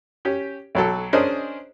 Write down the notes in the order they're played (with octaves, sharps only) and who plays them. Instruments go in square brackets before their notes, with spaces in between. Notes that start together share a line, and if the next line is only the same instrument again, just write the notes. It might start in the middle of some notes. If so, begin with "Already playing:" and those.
[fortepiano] C#4 G4
B1 F#3 A4
C#4 D4 G#4 A#4 C5 D#5